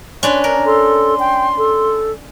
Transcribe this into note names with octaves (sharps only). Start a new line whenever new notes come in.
C#4 D4 B4 C6
D4 A#4
A4 C6
G5
A4